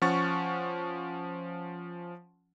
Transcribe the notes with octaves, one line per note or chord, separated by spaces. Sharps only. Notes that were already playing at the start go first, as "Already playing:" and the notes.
F3 C#4 F#5 C#6 A6